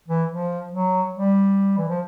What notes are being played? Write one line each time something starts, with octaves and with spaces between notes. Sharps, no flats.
E3
F3
F#3
G3
E3
F3